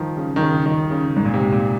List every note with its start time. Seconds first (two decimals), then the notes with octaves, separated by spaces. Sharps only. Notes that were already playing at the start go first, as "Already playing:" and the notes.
Already playing: D#3 F3
0.17 C#3
0.36 D#3
0.41 C#3
0.66 D#3
0.91 C#3
1.16 G#2
1.25 A#2
1.34 C3
1.52 A#2